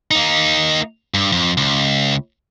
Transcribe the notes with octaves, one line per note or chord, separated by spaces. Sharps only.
A#3 D#4
G2
F2
C#2